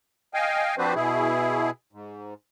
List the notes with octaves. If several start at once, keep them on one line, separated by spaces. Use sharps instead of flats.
D#5 F5 G5 G#5
F3 C4 D4 F#4 B4 C5
B2 E4 G#4
G#2